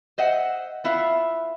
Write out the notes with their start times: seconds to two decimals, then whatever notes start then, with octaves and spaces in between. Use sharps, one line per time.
0.18 C5 D#5 E5 F#5
0.84 B3 E4 F4 E5 F5